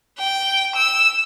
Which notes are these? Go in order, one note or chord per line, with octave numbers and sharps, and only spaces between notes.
G5
E6